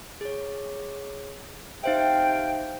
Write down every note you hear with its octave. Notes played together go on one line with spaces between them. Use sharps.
G#4 C#5
C3 D#4 C5 E5 F5 G5